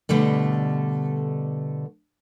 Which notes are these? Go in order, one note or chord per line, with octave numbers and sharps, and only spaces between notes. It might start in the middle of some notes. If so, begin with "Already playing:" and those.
B2 D3 G3 A3